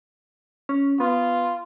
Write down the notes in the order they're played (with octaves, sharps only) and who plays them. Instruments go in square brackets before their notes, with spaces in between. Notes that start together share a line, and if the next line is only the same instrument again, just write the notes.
[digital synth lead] C#4
[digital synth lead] B3 [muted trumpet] F4